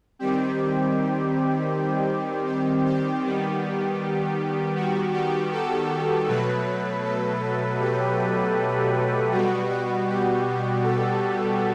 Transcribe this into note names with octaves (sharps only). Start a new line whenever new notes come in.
D#3 G3 C4 G4
G4
G4
D#3 G3 B3
F#4
G4
A4
B2 F#3 A3 B4
A4
G4
B2 G3 B3 F#4
F#4
G4
A4